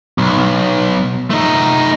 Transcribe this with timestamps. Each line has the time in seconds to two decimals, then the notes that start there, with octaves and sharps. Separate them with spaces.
0.18 B1
1.30 A3 D#4